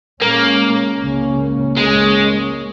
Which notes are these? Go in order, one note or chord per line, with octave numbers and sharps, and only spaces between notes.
A#2 G#3 A#3 C#4
C#2 C#3 A#3 C#4
C#2 C#3 G#3 A#3 C#4